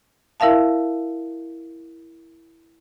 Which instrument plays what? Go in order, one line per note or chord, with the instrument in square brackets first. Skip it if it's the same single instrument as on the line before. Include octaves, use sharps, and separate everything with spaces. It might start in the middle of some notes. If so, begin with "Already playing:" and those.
[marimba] E4 A#4 E5 F5 A5